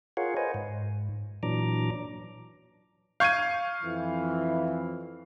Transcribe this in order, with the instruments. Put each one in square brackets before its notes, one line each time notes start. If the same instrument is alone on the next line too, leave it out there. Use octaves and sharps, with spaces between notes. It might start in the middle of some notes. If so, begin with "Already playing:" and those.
[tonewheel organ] F4 G#4 A#4 C#5 F5 F#5
B4 C5 D#5 G#5
G#2
A#2 E3 F#3 D4 A#5 D6
[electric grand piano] F5 C#6 [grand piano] G6 G#6 D#7
[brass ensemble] F2 E3